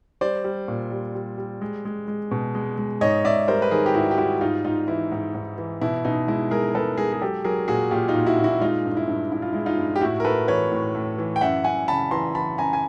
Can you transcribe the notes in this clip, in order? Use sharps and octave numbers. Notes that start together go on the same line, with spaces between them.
G3 C5 D5
G3
A#2
G3
G3
G3
G#3
G#3
G#3
B2
G#3
G#3
G#2 C#5 D#5
G#2 D5 E5
G3 A#4 C5
B4
D#3 G#4 A#4
G4
G#2 E4 F#4
G4
G3 E4 F#4
G#2 D#4 F4
G#2 D#4 F4
E3 E4
G#2
G#2
E3
B2 E4
B2 D#4
G#3 E4
G#3 G#4 A#4
G#3 A4 B4
G#3 G#4 A#4
G#4
F#3 G4 A4
F#3 G#4 A#4
A#2 F#4 G#4
A#2 F4 G4
D#4 F4
A#2
E4 F#4
A#2
E4 F#4
G#3 D#4 F4
G2
E4
G2
G2 E4
F4
G#3 E4
D#4 F4
G2
G4
A2 E4 F#4
A#4
A2 A4 B4
E3 B4 C#5
A2
A2
E3
G5
F#2 E5 F#5
F#2 F#5 G#5
C#3 A5 B5
E3 A#5 C6
E3 A5 B5
F#2 G#5 A#5
G#5